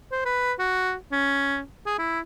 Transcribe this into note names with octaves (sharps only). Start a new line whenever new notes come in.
C5
B4
F#4
C#4
G#4
E4